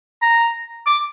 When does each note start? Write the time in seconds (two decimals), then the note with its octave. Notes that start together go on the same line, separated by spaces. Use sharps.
0.22 A#5
0.86 D6